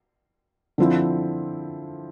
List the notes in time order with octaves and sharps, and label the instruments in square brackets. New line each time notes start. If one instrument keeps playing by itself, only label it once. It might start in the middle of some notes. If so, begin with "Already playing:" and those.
[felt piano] D3 F3 C4 E4